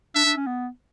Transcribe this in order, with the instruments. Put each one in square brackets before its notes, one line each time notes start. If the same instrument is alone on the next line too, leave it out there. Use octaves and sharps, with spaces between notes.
[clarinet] D4 [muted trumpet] E5
[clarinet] D4
C#4
B3